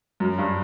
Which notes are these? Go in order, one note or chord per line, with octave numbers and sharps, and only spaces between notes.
F#2
G2